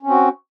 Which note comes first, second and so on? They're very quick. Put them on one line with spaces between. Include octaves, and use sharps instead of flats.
C#4 C4 F#4